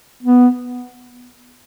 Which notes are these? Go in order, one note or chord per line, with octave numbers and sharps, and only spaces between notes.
B3